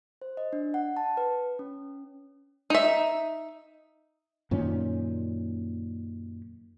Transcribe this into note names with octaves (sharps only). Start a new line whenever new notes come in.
C5
D#5
D4
F#5
A5
B4
C#4
D#4 E5
F#2 A#2 D#3 C#4